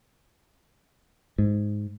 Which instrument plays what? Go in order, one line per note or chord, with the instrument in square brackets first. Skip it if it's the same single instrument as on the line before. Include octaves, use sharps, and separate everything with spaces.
[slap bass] G#2